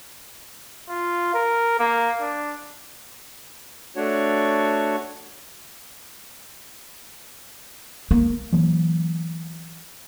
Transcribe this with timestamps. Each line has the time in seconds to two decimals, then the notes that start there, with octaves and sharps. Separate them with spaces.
0.89 F4
1.34 A#4
1.79 A#3
2.21 D4
3.96 A3 D4 F#4 C#5
8.11 A#3
8.53 E3 F#3 A#3